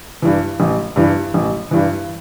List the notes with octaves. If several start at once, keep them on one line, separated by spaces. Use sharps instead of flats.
G2 E3
A1
G2 E3
A1
G2 E3